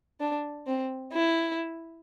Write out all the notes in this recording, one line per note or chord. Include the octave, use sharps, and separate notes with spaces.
D4
C4
E4